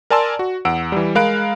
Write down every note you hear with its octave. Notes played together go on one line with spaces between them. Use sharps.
A#4 D5 G#5 A5 C6 E6
F#4
E2 F#5 E6 D7
E3 G3
G#3 A#4 F5 B5 F#6 D7